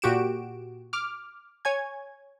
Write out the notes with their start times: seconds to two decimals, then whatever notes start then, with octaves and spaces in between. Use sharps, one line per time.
0.02 A#2 F#4 G4 D7 E7
0.93 D6 F6
1.65 C#5 G#5 G#6